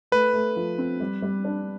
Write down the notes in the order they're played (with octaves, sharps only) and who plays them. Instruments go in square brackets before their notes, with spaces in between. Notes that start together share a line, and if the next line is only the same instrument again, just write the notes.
[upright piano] A3 [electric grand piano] B4
[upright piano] A3
F3
C4
G3
G3
D4